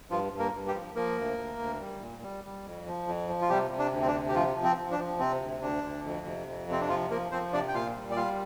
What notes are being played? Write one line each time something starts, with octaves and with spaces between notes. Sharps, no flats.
G2 F3 F4
G2
A#3 A#4
G2
G3 G4
F3
F3 A#3 A#4
D2
D2
D2
G3
A#2
G3
G3
F2
F3
F2
F3
F4
C3 G3 G4
C3
D4
D2
C4
D4
C3
G4
F3 F4
F3
C4
F3
D4
F3
C3 C4
D2
D2 D4
D2
F2
C3
F2
C3 C4
D4
F3 F4
F3 A#3 A#4
F3 C4 C5
C3 D4 D5
G5
A#2 F4 F5
G3
D5
G3 F4 F5